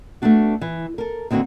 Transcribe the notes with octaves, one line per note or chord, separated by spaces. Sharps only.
A3 B3 C4 D4 F#4
E3
A4 A#4
D#2 D3 C4 F4 F#4